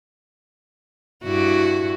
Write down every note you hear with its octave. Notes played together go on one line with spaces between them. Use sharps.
G2 E4 F#4